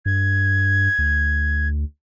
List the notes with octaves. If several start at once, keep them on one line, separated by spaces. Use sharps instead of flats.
G2 G#6
D2